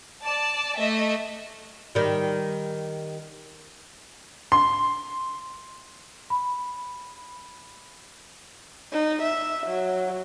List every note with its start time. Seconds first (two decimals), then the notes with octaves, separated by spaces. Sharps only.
0.24 D5 A5
0.77 A3 D#5 E5
1.95 D#3 G3
4.52 C6
6.30 B5
8.92 D#4
9.22 E5
9.67 F#3